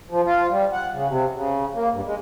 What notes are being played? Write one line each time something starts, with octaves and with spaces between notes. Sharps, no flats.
F3
F4
G3
F#5
C#3
C3
C#3
A#3
G2
G#3